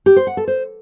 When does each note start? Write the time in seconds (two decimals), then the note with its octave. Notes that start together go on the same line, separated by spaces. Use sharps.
0.06 G4
0.16 C5
0.27 F#5
0.37 A4
0.47 C5